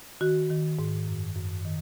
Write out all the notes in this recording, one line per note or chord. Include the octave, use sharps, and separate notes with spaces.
D#3 F#4
D#3
G#2
F#2
F#2
D#3